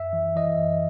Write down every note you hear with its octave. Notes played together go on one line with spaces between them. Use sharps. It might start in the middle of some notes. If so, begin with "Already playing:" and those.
Already playing: F#2 E5
E3
E3 D#5
F#2